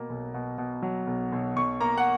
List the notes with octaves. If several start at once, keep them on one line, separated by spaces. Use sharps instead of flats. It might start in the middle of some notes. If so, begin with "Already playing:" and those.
Already playing: B2 A#3
B1
B2
B2
F#3
B1
B1
B1 C#6
A#3 A#5
F#5